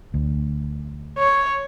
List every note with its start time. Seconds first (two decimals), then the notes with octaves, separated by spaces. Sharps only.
0.14 D2
1.19 C#5